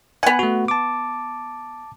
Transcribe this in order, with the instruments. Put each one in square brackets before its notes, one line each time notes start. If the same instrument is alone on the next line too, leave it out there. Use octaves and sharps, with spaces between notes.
[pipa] B3 F#5 [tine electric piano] G#5
[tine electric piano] A3 F#4
A5 D6